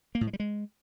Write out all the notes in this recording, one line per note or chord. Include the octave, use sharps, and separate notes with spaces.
A#3
A2
G#3
G3
G#3